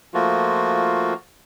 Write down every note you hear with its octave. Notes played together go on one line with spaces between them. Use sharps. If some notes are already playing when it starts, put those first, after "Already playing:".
F3 A3 A#3 F4 F#4